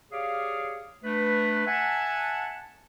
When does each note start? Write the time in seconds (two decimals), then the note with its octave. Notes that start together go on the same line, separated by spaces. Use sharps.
0.12 G4 G#4 C#5 D5 F5
1.04 A3 D4 B4
1.67 E5 F#5 G#5 A5